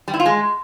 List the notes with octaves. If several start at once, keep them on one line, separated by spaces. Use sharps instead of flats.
G3
E4
F4
G#3